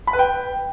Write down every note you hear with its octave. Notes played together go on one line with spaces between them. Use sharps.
B5
B4
G5